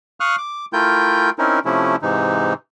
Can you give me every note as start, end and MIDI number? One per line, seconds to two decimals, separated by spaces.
0.20 0.36 77
0.20 0.36 85
0.20 0.36 87
0.20 0.36 89
0.20 0.36 90
0.38 0.66 86
0.73 1.30 57
0.73 1.30 64
0.73 1.30 65
0.73 1.30 70
0.73 1.30 79
0.73 1.30 91
1.38 1.59 60
1.38 1.59 61
1.38 1.59 63
1.38 1.59 64
1.38 1.59 70
1.65 1.96 48
1.65 1.96 53
1.65 1.96 57
1.65 1.96 61
1.65 1.96 64
2.02 2.53 44
2.02 2.53 48
2.02 2.53 52
2.02 2.53 63